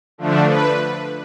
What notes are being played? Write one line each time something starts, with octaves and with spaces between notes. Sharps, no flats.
D3 F3 A3 D4
B4